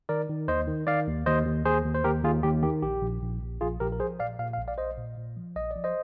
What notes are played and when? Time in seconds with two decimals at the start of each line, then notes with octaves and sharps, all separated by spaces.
0.09 D#3 A#4 D5
0.29 D#3
0.48 D#2 C5 D#5
0.67 D#3
0.87 D#3 D5 F5
1.07 D#2
1.26 D#2 C5 D#5
1.46 D#2
1.65 D#2 G#4 C5
1.84 D#2
1.94 C5
2.04 D#2 G4 A#4
2.24 D#2 F4 G#4
2.43 D#2 G4
2.63 D#3 G4
2.82 A#1 G4
3.02 A#1
3.21 A#1
3.42 A#1
3.61 A#1 F4 G#4
3.80 A#1 G4 A#4
3.92 A#4
4.00 F3 G#4 C5
4.20 A#2 D5 F5
4.39 A#2 F5
4.53 F5
4.58 A#1
4.68 D5 F5
4.78 A#1 C5 D#5
4.98 A#2
5.18 A#2
5.37 F3
5.56 A#1 D#5
5.71 D5
5.76 F3
5.84 C5 D#5